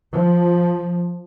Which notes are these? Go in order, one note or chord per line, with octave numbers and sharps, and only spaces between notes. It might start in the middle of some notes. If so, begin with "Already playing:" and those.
F3